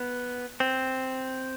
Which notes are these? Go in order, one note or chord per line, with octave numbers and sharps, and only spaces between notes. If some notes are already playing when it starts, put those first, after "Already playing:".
Already playing: B3
C4